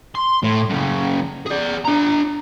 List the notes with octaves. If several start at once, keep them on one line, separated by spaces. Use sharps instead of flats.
C6
A2
F#2 C#3
G#4 D5
D4 A#5